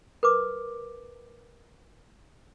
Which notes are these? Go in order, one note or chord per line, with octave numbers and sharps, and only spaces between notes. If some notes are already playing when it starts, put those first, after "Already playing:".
A#4 B4 D6